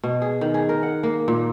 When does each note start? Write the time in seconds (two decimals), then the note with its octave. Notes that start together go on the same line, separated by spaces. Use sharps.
0.04 B2
0.22 G#4
0.41 D#3
0.54 G#4
0.69 A#4
0.83 F#5
1.03 A#3
1.28 A#2